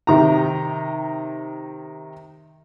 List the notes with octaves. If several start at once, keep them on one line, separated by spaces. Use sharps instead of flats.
C3 D#3 A#5